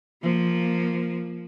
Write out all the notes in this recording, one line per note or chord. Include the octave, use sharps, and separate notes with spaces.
F3 A#3